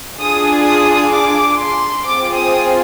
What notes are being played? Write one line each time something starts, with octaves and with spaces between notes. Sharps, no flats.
D4 F4 G#4 D#6
D#6
D6
C6
C4 F4 G#4 D6
D#6